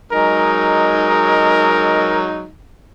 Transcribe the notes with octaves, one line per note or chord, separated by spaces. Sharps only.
F#3 G#3 D#4 A#4